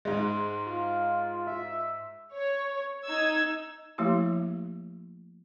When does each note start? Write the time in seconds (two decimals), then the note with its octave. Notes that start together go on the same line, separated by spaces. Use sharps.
0.05 G#2 G#3
0.67 F4
1.47 E5
2.34 C#5
3.04 D#4 E6 G#6
3.98 F3 A3 A#3 E4 G4